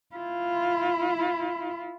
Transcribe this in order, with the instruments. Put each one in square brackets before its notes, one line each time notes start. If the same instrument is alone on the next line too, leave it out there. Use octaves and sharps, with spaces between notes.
[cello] E4 F4